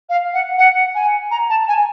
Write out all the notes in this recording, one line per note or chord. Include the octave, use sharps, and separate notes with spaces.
F5
F#5
F#5
G#5
A#5
A5
G#5